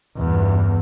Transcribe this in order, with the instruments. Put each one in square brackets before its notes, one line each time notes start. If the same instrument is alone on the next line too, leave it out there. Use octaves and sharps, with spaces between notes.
[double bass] E2 G2